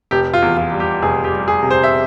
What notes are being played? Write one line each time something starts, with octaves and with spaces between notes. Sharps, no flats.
F1 G4
F4
E2
F4
G3
G4
F1 G#4
G4
G3
G#4
C3
C5
E5